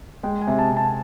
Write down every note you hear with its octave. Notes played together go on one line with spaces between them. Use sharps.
G#3 G5
G#5
C3
A5
C3
A5